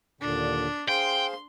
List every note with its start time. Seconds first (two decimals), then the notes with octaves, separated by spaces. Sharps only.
0.21 D#2 A#2 D3 D4
0.89 G#4 C5 F5 G5 C6